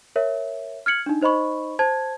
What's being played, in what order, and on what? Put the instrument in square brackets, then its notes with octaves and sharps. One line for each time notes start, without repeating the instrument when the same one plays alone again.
[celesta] A#4 C#5 E5
F6 G#6 C#7 F#7
D4 D#4
D#4 C5 D#5 B5 C#6
C5 A5 G#6